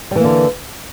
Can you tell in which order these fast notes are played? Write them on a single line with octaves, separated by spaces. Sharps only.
G3 E3 A#3 D3